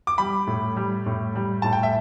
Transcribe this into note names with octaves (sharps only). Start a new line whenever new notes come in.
D6
G3 B5
A2
G3
A2
G3
A2 A5
G5
E5